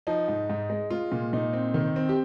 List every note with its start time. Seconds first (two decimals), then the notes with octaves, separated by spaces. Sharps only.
0.07 F3 D#4
0.28 G#2
0.50 G#2
0.70 G#3
0.90 G#3 F4
1.12 A#2
1.33 A#2 D#4
1.53 C4
1.74 D#3
1.96 C4
2.09 G4